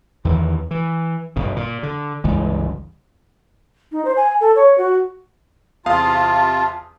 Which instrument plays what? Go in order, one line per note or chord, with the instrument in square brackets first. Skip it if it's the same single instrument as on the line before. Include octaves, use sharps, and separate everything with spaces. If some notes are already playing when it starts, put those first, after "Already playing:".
[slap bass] E2 D#3 E3
E3
G1 B2
A#2
D3
G1 C#2 E3 G#3
[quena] D#4
C5
G#5
A4
C#5
F#4
[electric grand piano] E2 F5 D#6 [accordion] C3 F4 [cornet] A5